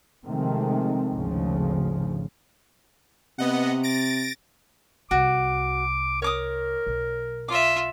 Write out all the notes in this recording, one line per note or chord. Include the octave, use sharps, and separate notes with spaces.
C3 D#3 F3 G#3 A3 C4
G#1 D2 C#3 F3
C3 B3 D#5 F#5
A6 A#6 D7
C2 F#4 D6
A#4 C#5 D6 D#6
B1
F4 E5 D6